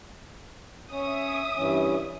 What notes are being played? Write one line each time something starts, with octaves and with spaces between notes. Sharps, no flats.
C#4 C#5 E5 D#6
G2 E3 C#4